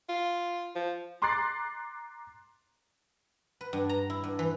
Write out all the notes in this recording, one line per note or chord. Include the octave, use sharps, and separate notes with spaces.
F4
F3
A#5 C6 D6 F#6 A6 C7
B4
G2
A#5
E4
G2
E3